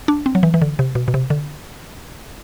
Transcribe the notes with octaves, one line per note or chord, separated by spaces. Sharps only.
D4
C4
F#3
E3
E3
D3
C3
B2
B2
C3
D3